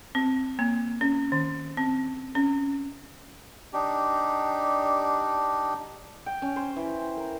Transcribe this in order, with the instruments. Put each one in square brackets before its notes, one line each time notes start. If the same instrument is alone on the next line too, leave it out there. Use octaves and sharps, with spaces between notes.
[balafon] C4
A#3
C#4
D#3
C4
C#4
[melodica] D4 D#4 G4
[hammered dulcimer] G5
C#4
C5
E3
A#4